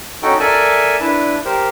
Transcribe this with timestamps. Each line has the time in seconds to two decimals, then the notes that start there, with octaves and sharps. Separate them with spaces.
0.22 C#4 D#4 F#4 A4 G5
0.40 A4 A#4 D5 E5 G#5 A5
1.01 D4 E4 B4
1.45 G4 A#4 C5